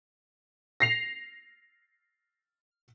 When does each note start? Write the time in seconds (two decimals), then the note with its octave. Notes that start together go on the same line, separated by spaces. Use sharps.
0.80 A#6 C7 F7